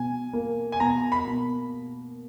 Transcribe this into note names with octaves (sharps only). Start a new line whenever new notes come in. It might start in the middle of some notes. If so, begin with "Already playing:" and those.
Already playing: B2 G#5
A#3
G#5
B2 A#5
B5
B2